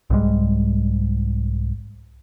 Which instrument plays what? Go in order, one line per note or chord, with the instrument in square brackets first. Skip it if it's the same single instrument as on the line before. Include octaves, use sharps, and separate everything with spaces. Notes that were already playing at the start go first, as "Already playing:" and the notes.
[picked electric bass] C2 G#2 G3 G#3